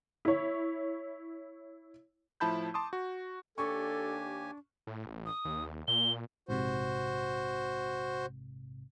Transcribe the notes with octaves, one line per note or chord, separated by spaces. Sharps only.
E4 C#5
A2 F3 E4 A5 B5 G6
A5 C6 D6 D#6
F#4
D#2 D4 G4 A4 G#5 C#6
A2
A1
D#6
D#2
A#2 G7
A#1 G#2 C3 F#4 C5